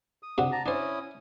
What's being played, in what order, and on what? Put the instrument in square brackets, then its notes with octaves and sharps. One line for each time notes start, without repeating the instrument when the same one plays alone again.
[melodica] D#6
[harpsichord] C3 D4 F#4
[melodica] A5 A#5
[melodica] C#4 E4 D#6 [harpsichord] D4 C5